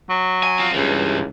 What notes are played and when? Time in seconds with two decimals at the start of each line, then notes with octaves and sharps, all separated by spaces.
0.10 F#3
0.43 G#5
0.58 F3 C4
0.74 C#2 G2 E3